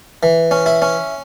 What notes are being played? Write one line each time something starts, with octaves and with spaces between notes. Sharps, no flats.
E3
C#4
E4
C#4